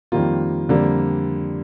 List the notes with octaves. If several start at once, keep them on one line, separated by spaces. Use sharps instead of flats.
F2 D#3 G3 A#3 F4
F2 D3 G3 A#3